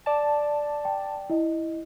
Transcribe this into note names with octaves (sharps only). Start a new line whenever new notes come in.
D5 A5
G5
E4 D#5